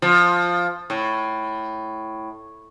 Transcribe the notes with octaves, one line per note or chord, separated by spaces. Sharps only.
F3
A2